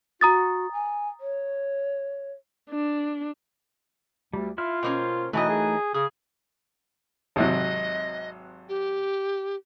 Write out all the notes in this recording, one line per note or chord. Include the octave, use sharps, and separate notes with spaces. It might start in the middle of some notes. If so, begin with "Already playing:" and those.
F#4 A#5 D#6 A6
G#5
C#5
D4
D2 G3
E4 F4 E5 F6
B2 A#3 C#4 C5 G5
B2 E3 F#3 A3 D#4 A#4 D#5
G#4
C#3 G#4 D#6
G#1 C3 F#3 D#5
G4